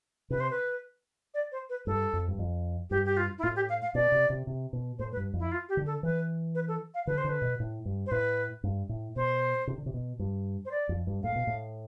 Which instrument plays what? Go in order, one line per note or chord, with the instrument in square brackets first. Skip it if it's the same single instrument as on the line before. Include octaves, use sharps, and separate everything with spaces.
[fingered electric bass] C3 [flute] B4
[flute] C5
B4
D5
C5
B4
[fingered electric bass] G2 [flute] A4
[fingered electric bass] F2
G2
F2
[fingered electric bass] G2 [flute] G4
[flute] G4
F4
E4
[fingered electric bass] A2 [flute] F4
[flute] G4
F5
F5
[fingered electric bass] B2 [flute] D5
[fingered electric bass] C3
C3
C3
B2
[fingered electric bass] A2 [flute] C5
[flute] B4
[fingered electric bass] G2
F2
[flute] E4
F4
G4
[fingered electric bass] D3
[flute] A4
[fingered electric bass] E3 [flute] B4
[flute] B4
A4
F5
[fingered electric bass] D3 [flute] B4
[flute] C5
[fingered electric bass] D3 [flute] B4
[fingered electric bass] B2
A2
G2
[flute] C5
[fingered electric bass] A2 [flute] B4
[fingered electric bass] G2
A2
[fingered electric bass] B2 [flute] C5
[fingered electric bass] C3
D3
C3
B2
G2
[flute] C5
D5
[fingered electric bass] F2
G2
[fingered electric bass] A2 [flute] F5
[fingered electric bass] B2
A2